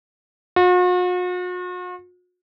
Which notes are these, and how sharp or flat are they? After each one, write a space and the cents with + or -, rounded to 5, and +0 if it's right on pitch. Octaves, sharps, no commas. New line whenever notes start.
F#4 -45